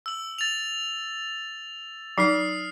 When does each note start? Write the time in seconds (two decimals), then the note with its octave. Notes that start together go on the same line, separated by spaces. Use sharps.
0.06 E6 F#7
0.38 A6 F7
2.18 F#3 D#4 D#6 F6 C7